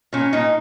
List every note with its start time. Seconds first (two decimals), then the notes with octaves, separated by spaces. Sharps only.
0.13 A#2 C#4
0.33 A#2 D#4